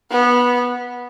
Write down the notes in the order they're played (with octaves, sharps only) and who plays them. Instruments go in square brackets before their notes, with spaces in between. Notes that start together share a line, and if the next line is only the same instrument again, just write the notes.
[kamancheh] B3